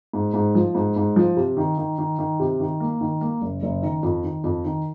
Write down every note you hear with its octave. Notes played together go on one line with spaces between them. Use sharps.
G#2
G#2
F3
G#2
G#2
F3
C3
D#3
D#3
D#3
D#3
C3
D#3
A#3
D#3
A#3
F#1
F#1
D#3
F2
D#3
F2
D#3